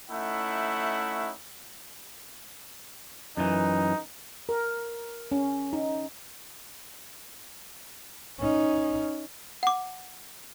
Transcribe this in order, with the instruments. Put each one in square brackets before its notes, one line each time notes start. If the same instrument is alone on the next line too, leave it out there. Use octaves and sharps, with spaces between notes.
[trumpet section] A3 C#4 D#4 E4 F#5
[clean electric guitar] F#2 E3 [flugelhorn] D#4
[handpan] A#4
C#4
D#4
[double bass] C#4 D#4
[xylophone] F#5 D6